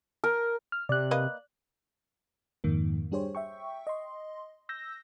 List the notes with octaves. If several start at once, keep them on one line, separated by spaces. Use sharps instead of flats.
A#4
F6
C3 D5 F#6
A#3 B4 D#5
F2 G#2 D#3 A#3
G3 D4 G4 G#4 C5 C#5
E5 G5 C#6
D#5 C6
E6 G6 A#6